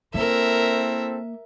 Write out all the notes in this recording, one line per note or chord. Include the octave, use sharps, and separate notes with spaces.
A#3 C4 E4 A4 A#4 E5